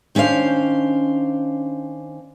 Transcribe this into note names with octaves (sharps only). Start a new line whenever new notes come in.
D#3 C#4 D4 C5 F5